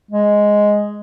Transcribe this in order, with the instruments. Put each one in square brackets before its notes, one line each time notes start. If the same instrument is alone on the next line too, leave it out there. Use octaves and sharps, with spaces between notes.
[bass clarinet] G#3